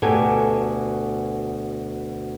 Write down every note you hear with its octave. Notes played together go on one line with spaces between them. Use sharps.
D2 B2 G4 A4 G#5